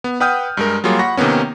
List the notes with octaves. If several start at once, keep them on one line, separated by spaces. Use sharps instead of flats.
B3
B4 F#5 G5 D#6 F6 G6
G2 G#3 A#4
F#3 G3 A#3 F4 G#4 C#5
F#5 B5 C#6 A#6
C3 D#3 A#3 B3 C#4